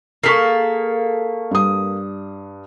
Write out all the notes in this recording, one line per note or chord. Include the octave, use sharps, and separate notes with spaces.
A#3 G#4 A4 C#6 B6 C7
G2 D#6